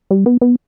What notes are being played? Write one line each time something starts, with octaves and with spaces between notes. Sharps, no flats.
G3
B3
B3